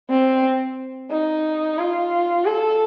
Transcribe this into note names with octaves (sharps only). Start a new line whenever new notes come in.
C4
D#4
F4
A4